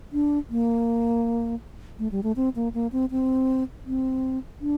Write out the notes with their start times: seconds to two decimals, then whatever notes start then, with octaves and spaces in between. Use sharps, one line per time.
0.13 D4
0.50 A#3
1.99 A3
2.12 G3
2.23 A3
2.36 C4
2.56 A#3
2.74 A#3
2.92 C4
3.11 C4
3.86 C4
4.61 D4